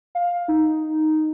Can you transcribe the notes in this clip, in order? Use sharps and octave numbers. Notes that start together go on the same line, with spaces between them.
F5
D#4